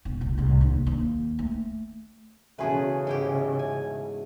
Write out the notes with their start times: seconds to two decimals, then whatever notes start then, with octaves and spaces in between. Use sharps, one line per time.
0.05 E1
0.21 C#2
0.38 C2 A2
0.61 D#2 D4
0.87 D#2
1.39 A3
2.58 E2 C#3 A3 C#4 F#4 G#4 B4
3.07 G#2 E4 G4
3.59 G#5